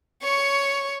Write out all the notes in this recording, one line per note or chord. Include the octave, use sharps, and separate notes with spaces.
C#5 C#6